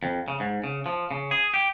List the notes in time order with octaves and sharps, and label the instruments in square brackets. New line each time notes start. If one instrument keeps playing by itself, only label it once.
[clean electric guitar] F2
C#3
G#2
C#3
F3
C#3
G#4
G4